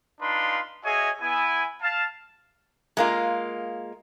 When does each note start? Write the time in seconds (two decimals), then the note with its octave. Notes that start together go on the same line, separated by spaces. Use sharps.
0.21 D4 D#4 F4 B4 F5 C6
0.85 F#4 G#4 C#5 D#5 E5 G#5
1.21 B3 E4 G#5
1.82 F5 A5
2.97 G#3 A#3 F4